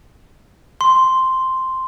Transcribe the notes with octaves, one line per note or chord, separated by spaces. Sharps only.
C6